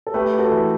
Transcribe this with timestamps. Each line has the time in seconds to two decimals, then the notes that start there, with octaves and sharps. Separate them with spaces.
0.07 A4
0.14 A3 G4 B4
0.34 G4
0.39 F#4 A4
0.52 E3